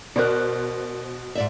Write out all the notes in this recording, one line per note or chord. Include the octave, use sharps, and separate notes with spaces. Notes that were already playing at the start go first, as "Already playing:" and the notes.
B2 A#4 C5 D5 F#6
G#2 D5 E5